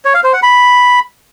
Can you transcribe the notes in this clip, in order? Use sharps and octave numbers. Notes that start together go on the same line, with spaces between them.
C#5
F5
C5
F#5
B5